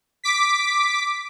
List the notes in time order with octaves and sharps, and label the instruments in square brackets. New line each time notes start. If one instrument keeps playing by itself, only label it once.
[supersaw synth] D6 B6